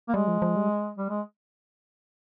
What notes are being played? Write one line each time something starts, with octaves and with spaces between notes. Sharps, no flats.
A#3
G3 G#3
F3
F3
G3
G3
G#3